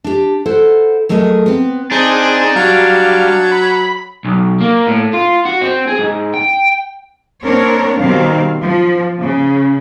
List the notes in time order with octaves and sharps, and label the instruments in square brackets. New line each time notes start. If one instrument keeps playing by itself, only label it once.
[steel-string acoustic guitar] D4 G4
E4 A4 C5 F#5
F#3 A3 G#4 A#4 D#5
B3 C4
[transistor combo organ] C4 G#4 [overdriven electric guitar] D4 [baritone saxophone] D#4
[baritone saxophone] F#3 [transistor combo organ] G3 F5
[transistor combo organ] B5
[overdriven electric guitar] B1
A#3
A2
F4
F#4
C4
G#4
G#2
G5
[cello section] A#3 C4 D4 A#4 C#5
B2 D#3 G3 C4 F5
F3
C#3